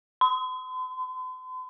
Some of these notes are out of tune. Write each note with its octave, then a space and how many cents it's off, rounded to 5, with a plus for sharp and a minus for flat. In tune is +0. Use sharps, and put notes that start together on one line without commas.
C6 -45